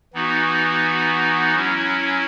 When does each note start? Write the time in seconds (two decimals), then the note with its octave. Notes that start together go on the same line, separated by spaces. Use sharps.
0.13 E3 B3 D#4 F#4
1.54 F#3 C#4 E4